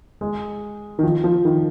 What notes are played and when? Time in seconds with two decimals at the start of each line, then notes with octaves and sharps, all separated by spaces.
0.21 G#3
0.99 D#3
1.03 F3
1.24 F3
1.45 D#3